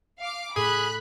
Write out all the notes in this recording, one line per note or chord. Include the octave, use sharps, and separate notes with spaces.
F5 D6
A2 G#4 B5 F#6